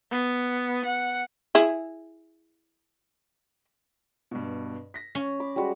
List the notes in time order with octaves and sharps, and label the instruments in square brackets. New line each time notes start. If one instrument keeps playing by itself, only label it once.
[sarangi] B3
F#5
[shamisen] E4 G#4
[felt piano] G2 B2
A#6 B6
[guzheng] C#4
[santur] B5 D6
G3 G#3 F#4